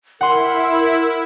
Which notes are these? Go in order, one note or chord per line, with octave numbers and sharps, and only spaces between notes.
E4 A#4 F#5 C6